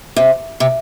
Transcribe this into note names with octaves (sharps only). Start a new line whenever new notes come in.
C3
C3